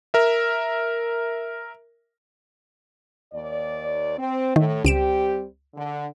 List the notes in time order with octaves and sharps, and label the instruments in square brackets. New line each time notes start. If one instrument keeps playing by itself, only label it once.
[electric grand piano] A#4 E5
[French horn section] D#2 D5
C4
[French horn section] A2 [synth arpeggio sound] D#3
[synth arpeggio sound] C#2 D7 E7 [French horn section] G3 C4 G4
[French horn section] D3